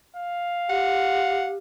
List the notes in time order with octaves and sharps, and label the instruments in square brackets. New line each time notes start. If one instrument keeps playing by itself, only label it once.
[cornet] F5
[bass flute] G4 [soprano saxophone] F#5